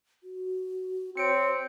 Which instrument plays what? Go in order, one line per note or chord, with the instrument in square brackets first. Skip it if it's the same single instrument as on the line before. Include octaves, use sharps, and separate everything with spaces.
[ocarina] F#4
[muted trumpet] C4 [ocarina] C#5 [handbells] C#7 D7